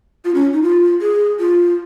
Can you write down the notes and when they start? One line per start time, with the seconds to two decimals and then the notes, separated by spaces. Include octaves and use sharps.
0.25 F4
0.35 C#4
0.53 D#4
0.62 F4
1.01 G#4
1.39 F4